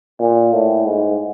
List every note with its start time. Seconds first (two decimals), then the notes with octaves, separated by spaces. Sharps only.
0.20 A#2
0.53 A2
0.86 G#2